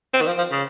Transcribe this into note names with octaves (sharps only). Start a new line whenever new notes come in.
C4
D#3
F3
F3
C#3